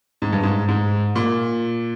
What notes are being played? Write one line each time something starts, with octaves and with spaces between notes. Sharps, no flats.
G#2
G2
G#2
G#2
A#2